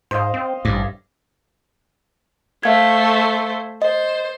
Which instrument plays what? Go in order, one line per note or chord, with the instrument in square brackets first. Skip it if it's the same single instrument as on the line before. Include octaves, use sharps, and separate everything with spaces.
[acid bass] G#2 [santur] C5 D#5 F5
[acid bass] C4
[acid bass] A1 [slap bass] G2 [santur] D5
[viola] A3 C5 [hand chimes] E5 F5 G#6
[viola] C5 [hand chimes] D#5